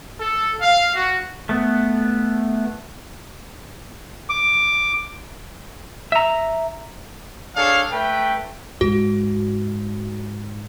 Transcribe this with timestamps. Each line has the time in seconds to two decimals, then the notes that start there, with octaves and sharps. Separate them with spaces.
0.19 A4
0.62 F5
0.95 F#4
1.49 A3 B3
4.29 D6
6.12 E5 A#5
7.56 D4 G#4 A4 C#5 F5
7.91 A3 B4 G5
8.81 G#2 F#4